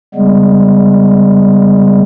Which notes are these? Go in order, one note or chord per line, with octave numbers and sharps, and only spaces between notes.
C#3 G3 G#3 B3